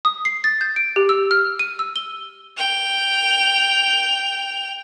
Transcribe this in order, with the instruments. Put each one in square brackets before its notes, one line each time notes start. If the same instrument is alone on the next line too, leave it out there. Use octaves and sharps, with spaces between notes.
[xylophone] D#6
C7
A6
G6
D7
G4
E6
F6
D#7
E6
G7
[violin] G5 F7